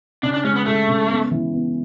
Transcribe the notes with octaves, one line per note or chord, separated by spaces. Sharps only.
C#3 D4
D4
G#3 C#4
B3
G#3 A3
C#3
B3
E3
B3